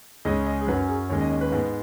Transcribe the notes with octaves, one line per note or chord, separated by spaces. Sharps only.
C#2 C#3 G#3 C#4 D#5
D#5
G#4
F#2 F#3 C#4 B4
G#4
D#2 D#3 G#3 C#4 C#5
D#5
D#5
B4
G#2 G#3 B3